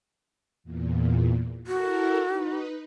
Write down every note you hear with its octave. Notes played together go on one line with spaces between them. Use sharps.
E2 A#2
E4 F#4 A4 A#4
D#4 B4